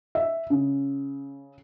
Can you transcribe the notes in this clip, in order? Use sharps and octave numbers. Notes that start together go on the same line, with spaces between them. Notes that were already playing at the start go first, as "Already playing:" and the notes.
E5
C#3